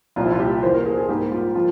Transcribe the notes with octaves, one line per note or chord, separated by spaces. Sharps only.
C2 A#2 F3 F4
E4
F4
G4
E2 E3 A#3 C5
A#4
G#4
G#4
G#2 G3 A#3 G4
F4
F3 F4